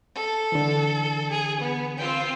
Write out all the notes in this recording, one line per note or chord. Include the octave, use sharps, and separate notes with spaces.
A4
D3 E3
G#4
B3
C4 F4 G5